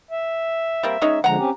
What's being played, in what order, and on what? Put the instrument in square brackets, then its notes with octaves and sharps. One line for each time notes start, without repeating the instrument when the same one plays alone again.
[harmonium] E5
[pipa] G3 A#3 C4
G#3 C#4 D#4
[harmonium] D3 F3 G#3 [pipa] F#5 A#5
[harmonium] C4 C#4 G4